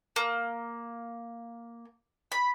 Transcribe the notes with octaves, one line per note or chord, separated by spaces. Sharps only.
A#3
B5